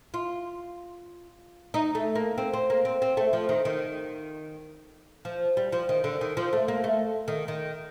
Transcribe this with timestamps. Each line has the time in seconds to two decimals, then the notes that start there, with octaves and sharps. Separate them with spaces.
0.14 F4
1.74 D#4
1.95 A3
2.15 A#3
2.38 C4
2.53 C4
2.70 A#3
2.85 C4
3.02 C4
3.17 A3
3.33 F3
3.49 D#3
3.65 D#3
5.25 F3
5.57 G3
5.72 F3
5.89 D#3
6.04 D3
6.21 D#3
6.37 F3
6.53 A3
6.68 A#3
6.84 A3
7.28 D#3
7.48 D#3